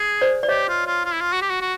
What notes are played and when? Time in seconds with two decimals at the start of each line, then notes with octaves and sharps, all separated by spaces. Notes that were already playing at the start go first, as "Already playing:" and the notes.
Already playing: G#4
0.21 C5 D5
0.43 D5
0.49 G4 C#5 D#5
0.68 F4
0.86 F4
1.05 F4
1.13 E4
1.21 F4
1.33 F#4
1.42 G4
1.50 F#4
1.61 F#4